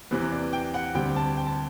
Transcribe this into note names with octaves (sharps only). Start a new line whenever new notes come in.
E2 C3 E3 B4
D5
G5
F#5
D2 C3 G3 G5
A5
G5
A5